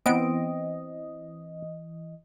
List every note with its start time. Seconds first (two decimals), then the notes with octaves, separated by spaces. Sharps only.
0.06 E3 B3 C4 D#5 D7